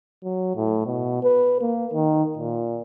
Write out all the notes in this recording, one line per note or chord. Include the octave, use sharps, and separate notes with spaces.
F#3
A2
B2
B4
A#3
D#3
A#2